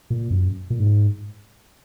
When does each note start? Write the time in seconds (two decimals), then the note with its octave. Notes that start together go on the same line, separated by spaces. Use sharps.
0.10 A#2
0.31 F#2
0.70 A#2
0.80 G#2